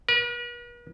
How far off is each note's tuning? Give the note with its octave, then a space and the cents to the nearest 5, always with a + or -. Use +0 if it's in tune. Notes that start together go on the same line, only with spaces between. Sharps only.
B4 -45